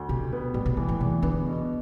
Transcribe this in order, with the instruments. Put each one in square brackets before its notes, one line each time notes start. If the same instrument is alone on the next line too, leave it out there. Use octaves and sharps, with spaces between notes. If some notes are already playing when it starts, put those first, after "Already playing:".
Already playing: [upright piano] D2
[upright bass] B2 [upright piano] G4
[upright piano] B3
[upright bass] A2 [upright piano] G3
[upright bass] B2
[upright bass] D3 [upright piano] E3
[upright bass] A2
[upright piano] E2 [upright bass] B2
[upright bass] D3 [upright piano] B3
[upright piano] B2